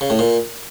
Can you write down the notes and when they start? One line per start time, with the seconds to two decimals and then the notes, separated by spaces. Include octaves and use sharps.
0.01 C#3
0.10 A2
0.19 A#2